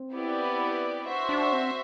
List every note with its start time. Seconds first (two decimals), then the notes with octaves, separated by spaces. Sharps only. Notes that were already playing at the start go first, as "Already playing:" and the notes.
Already playing: C4
0.13 B3 E4 G4 B4 D5
1.06 D4 F#4 C5 E5
1.29 D4
1.53 C4